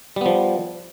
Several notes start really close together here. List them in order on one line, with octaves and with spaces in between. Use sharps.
G3 B3 F3